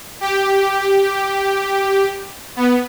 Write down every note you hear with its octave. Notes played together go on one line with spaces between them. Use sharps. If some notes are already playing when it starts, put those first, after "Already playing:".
G4
B3